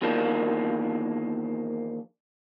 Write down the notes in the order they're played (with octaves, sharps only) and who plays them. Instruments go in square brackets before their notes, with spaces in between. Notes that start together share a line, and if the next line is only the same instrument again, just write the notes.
[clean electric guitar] E2 D#3 F3 A#3 D4